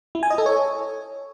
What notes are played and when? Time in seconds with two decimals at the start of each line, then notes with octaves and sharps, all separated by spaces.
0.15 E4
0.23 G#5
0.30 D#5
0.38 A4
0.46 C#5